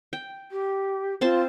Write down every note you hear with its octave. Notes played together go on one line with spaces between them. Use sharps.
G5
G4
C4 F4 C5 A5